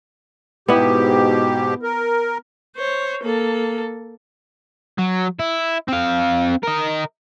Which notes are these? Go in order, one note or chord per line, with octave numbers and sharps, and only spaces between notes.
G#2 B2 B3 E4 G4
A#4
C5 C#5
A#3 A4
F#3
E4
C4 F5
A#4 D#5